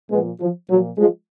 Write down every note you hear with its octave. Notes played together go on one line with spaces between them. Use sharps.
A#2 F3 G#3 B3
F3
A#2 F3 F#3
F3 G#3